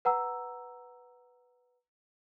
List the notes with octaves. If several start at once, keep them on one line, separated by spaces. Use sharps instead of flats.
B4 F#5 A#5 E6